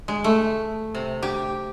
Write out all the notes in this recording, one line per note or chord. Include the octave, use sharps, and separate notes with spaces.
G#3
A3
C3
G4